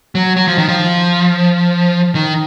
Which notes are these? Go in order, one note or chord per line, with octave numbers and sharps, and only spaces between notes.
F#3
F#3
F3
D#3
F3
D#3